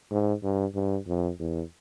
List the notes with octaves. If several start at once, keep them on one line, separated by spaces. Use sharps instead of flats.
G#2
G2
G2
F2
E2